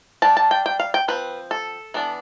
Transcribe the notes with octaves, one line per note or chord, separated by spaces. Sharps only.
G3 D4 A5
A5
G5
G5
F5
G5
F3 C4 B4
A4
E3 B3 D4